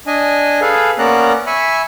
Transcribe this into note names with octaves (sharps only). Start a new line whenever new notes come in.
D4 D#5 G#5
G#4 A4 B4 F5
A#3 B3 C#4 D5 A#5 F#6
E5 G#5 B5 C#6